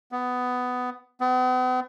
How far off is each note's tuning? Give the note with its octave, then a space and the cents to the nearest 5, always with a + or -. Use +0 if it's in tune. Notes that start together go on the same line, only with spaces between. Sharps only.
B3 +15
B3 +45